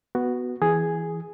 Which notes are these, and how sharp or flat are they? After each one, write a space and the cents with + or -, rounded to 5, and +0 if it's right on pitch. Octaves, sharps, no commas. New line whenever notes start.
B3 +0 F#4 +0
E3 +0 G#4 +0